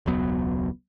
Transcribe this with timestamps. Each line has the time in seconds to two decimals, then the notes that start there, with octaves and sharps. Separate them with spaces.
0.06 E1 C#2 F#3 B3